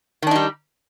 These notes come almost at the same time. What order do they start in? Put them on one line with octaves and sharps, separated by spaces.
D#3 D4 D#4 G3